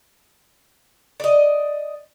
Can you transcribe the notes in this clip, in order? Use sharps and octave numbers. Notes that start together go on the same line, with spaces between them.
D5 D#5